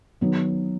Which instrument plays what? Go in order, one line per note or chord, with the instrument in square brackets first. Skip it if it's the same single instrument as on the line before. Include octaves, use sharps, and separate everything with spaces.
[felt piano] D#3 F#3 B3